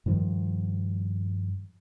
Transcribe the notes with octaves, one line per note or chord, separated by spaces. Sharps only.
G2 D#3 F3 G3